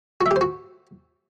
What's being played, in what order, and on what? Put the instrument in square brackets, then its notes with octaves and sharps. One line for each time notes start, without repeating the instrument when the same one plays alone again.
[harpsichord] F#4
E5
G4
C5
F#4